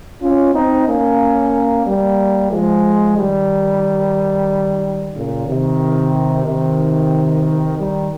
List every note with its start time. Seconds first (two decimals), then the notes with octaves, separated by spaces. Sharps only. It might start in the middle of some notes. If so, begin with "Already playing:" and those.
0.20 C#4 F4
0.54 C4 D#4
0.87 A#3 C#4
1.85 G3 A#3
2.51 F3 G#3
3.17 D#3 G3
5.14 A#2 C#3
5.47 C3 D#3
6.45 C3 D#3
7.77 D#3 G3